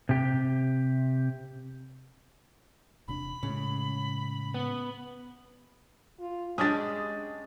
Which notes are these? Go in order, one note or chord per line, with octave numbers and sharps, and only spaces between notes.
C3 G4
E1 C3 D4 B5
A2 C#3 G#3 A3
B3
F4
G#3 C#4 D4 G4 D#6 A6